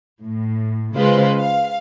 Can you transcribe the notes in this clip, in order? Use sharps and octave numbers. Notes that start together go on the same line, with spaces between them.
A2
C#3 G#3 F4 B4 C5
F5